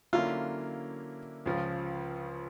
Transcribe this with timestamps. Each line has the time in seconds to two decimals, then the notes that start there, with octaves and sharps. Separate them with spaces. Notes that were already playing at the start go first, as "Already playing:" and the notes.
0.13 D3 F#3 A#3 C#4 E4 F4
1.46 C#2 C#3 F3